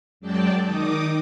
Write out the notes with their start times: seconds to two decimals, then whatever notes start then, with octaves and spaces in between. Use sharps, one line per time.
0.20 F#2 F#3 G#3 D5 G5 A5
0.62 D#3 D#4 D6 D#6